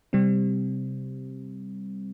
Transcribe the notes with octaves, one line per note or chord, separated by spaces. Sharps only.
C3 G3 C4